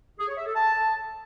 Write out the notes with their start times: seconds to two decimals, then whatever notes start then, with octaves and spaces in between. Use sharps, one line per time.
0.19 G#4
0.29 C#5
0.38 E5
0.47 A4
0.56 A5